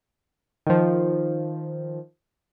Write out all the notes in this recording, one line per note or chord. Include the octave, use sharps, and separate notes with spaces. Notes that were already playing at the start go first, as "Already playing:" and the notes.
D#3 F3